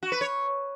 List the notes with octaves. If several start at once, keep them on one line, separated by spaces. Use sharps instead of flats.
F#4
B4
C#5